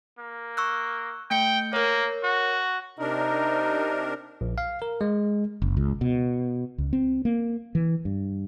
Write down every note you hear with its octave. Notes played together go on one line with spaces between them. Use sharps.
A#3
C#6 E6 F#6
A3 G5 G6 C#7
A#3 A#4 C#5
F#4
C3 D4 D#4 A#4
A#1
F5
A#4
G#3
F#1
C#2
B2
C#2
C4
A#3
E3
G2